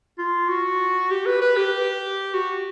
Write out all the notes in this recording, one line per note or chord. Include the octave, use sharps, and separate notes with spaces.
F4
F#4
G4
B4
B4
G4
F#4